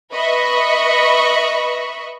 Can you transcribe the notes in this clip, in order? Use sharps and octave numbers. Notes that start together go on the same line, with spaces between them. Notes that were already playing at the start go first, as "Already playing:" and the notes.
B4 D#5 E5 B5 C#6